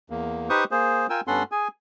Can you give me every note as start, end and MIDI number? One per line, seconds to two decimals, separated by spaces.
0.10 0.49 40
0.10 0.49 58
0.50 0.64 63
0.50 0.64 67
0.50 0.64 71
0.50 0.64 72
0.50 0.64 85
0.50 0.64 87
0.71 1.07 58
0.71 1.07 68
0.71 1.07 72
1.10 1.21 65
1.10 1.21 70
1.10 1.21 79
1.10 1.21 80
1.10 1.21 88
1.27 1.43 43
1.27 1.43 59
1.27 1.43 61
1.27 1.43 69
1.27 1.43 78
1.27 1.43 84
1.52 1.68 68
1.52 1.68 80